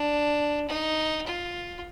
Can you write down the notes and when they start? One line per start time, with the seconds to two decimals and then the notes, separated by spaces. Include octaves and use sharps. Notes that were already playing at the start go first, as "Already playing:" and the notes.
Already playing: D4
0.68 D#4
1.26 F4